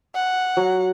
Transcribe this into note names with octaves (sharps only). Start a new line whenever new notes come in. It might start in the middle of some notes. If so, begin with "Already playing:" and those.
F#5
F#3